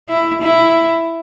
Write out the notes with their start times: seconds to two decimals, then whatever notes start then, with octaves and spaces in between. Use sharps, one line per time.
0.09 E4
0.42 E4